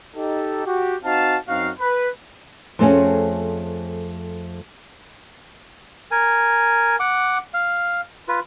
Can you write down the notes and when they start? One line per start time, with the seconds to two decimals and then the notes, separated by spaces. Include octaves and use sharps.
0.15 D#4 G4 A4
0.65 F#4 G4
1.04 C4 D#4 F#4 F5 A5
1.48 F#2 C4 D#4 F#4 F5
1.79 B4
2.79 F2 A3 C4 C#4 G#4
6.11 A#4 G#5
7.00 F#5 D6
7.54 F5
8.28 F4 B4